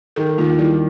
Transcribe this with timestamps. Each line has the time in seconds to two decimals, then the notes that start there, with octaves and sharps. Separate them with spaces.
0.16 D#3 A4
0.38 D#2 F4
0.59 G3 E4